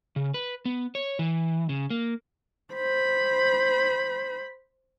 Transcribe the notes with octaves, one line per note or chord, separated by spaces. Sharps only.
C#3
B4
B3
C#5
E3
C#3
A#3
C5 B5